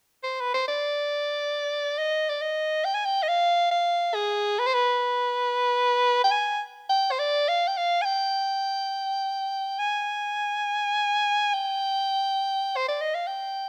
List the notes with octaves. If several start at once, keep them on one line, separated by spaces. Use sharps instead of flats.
C5
B4
C5
D5
D#5
D5
D#5
G5
G#5
G5
D#5
F5
F5
G#4
B4
C5
B4
G5
G#5
G5
C5
D5
F5
G5
F5
G#5
G5
G#5
G5
C5
D5
D#5
F5
G5